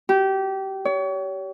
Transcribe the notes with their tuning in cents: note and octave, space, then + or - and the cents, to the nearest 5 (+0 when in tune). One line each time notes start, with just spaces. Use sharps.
G4 -25
C#5 +35